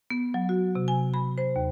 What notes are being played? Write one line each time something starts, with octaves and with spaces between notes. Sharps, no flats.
B3
F#3
F#4
C3
G#5
B5
C5
D#2